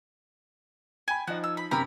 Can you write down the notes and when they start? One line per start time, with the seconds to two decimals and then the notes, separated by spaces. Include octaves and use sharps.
1.08 G5 G#5 B5
1.27 F3 D#4 F#4 F#5
1.44 E6
1.57 B5
1.71 F#2 C3 G4 A#4 B5